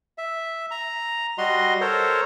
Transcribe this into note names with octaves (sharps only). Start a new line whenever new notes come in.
E5
A#5
G3 F#4 D#5 C6
A4 A#4 C5 C#5